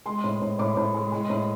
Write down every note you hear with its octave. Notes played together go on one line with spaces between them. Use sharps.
G#3 C6
A2
A2
A2 D6
A2
G#3
G#3
A2